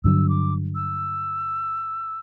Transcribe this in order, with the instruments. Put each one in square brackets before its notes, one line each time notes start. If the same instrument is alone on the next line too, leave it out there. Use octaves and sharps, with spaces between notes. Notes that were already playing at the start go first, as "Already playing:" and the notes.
[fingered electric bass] G2 D3 F#3 [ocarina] E6
[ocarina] D6
E6